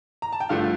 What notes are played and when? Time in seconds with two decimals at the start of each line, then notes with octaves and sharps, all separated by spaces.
0.22 A#5
0.32 A5
0.40 G5
0.49 G2 D3 F3 A3 F5